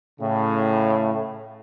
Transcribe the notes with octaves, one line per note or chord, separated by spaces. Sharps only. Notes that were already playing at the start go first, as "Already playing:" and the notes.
A2 C#3